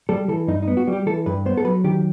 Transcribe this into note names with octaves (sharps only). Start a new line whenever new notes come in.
G3 A4
E3 A4
G2 D#4
D#4
B3
F#4
G3 G4
E3 A4
G2 B4
B3 C5
A4
F#3 B4
D#3 G4